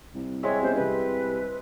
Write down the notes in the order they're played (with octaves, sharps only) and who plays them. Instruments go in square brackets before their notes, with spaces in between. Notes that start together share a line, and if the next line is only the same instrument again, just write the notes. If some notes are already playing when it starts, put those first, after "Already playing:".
[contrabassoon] C2
[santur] G#3 C4 E5 [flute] C#5
[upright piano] G3 B3 C#4 [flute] C5
[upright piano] C3 G3 [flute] B4